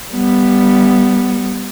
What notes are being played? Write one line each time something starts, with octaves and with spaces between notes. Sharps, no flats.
G3 B3